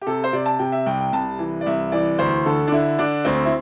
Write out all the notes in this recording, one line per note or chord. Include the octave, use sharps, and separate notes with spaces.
G4
C3 A4
C5
C3 D5
A5
C3 G5
E5
C2 G5
G5
C2 A5
E3
D5
C2 E5
E3 D5
D2 C5
D3 A4
D4
D3 E4
D3 D4
D2 C4
E4